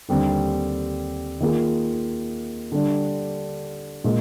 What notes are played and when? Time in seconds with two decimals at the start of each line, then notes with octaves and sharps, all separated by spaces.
0.09 D#2 D3 G3 C4
1.41 D#3 A#3 F4 G#4
2.72 D3 G3 D4
4.04 A#2 G#3